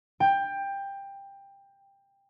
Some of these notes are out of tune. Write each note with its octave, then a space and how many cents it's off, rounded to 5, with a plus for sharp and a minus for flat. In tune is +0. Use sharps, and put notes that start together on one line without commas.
G5 +15